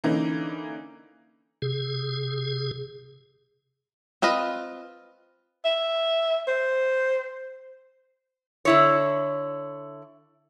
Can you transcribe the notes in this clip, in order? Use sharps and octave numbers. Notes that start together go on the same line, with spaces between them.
D3 E3 A#3 C#4 D#4
C3 G#4
C4 F4 B4 D#5
E5
C5
D3 E4 C#5